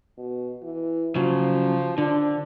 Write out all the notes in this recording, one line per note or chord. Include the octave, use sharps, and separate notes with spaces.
B2
E3
C#3 F3 F#3
D3 D4